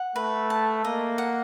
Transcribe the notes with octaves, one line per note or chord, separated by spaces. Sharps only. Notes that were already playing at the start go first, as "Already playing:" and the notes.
Already playing: F#5
A3 B4
A5
A#3 D#5
F#5